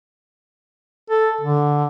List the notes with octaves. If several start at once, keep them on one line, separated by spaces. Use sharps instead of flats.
A4
D3